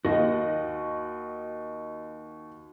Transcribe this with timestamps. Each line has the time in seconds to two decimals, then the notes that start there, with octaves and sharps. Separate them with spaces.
0.05 D#2 F#4 D#5